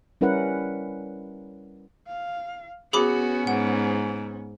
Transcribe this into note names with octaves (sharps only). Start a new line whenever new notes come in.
G3 C#4 E4 A#4 B4 F#5
F5
B3 C#4 F#4 G#4 B5 D6
G#2 F#5